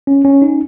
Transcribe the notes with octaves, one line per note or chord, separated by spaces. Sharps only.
C#4
C#4
D#4